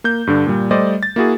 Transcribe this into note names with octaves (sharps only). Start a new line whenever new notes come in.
A#3 G6
G2 D3 D4
A#2 G3
G3 A3 C5 D5 D#5
A6
A#3 E4 F#4 G#4